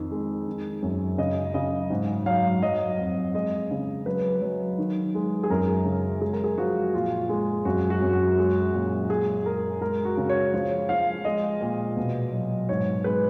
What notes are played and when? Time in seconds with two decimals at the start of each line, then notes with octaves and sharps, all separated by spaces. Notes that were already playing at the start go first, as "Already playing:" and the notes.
Already playing: F2 D#3
0.11 G#3
0.47 D#3
0.82 F#2
1.18 C#3 D#5
1.54 C#3 D#5
1.90 G#2
2.26 F#3 F5
2.62 F#3 D#5
2.98 F2
3.34 G#3 D#5
3.71 C#3
4.06 F#3 B4
4.42 F#3
4.78 D#3
5.15 G#3
5.43 G#4
5.50 F#2 A#4
5.85 C#3
6.21 G#3 G#4
6.33 A#4
6.44 G#4
6.58 F3 F#4
6.94 A#2 F4
7.29 G#3
7.65 F#2 F#4
7.90 F#4
8.02 F#2
8.13 F#4
8.38 G#3
8.73 A#2
9.09 G#3 G#4
9.45 G#3 A#4
9.81 G#3 A#4
10.05 F#4
10.17 C#3
10.29 C#5
10.54 F3 C#5
10.89 F3 F5
11.25 G#3 D#5
11.61 A#2
11.97 B2
12.32 F#3
12.69 G#2 C#5
13.04 G#3 B4